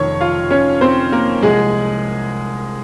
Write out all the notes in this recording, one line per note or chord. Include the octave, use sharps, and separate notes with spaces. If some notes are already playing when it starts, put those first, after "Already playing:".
Already playing: F1 F2 D#3 C#5 C#6
F4 F5
C#4 C#5
C4 C5
A#3 A#4
C2 C3 F3 G#3 G#4